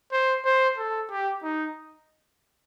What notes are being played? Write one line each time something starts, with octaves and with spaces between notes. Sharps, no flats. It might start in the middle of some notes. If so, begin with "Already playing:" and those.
C5
C5
A4
G4
D#4